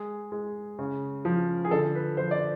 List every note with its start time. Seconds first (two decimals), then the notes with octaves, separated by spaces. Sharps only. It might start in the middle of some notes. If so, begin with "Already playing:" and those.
Already playing: G#3 G#4
0.32 G#3
0.79 C#3
1.25 F3
1.65 G#4
1.71 D3 A4
1.95 B4
2.17 F3 C5
2.31 D5